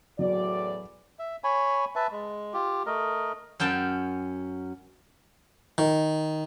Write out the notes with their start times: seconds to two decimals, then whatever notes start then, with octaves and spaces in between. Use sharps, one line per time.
0.19 E2 A2 F#3 D5
1.19 E5
1.44 C#5 G#5 B5
1.95 B4 E5 A5
2.11 G#3
2.53 F4 G4
2.86 A3 A#4 D#5
3.60 F#2 C#4 G5 A5
5.78 D#3